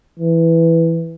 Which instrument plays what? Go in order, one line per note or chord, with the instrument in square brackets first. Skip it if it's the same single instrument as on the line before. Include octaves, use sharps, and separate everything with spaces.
[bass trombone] E3